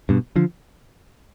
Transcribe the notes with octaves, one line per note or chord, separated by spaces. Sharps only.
G2 B2
D3 F3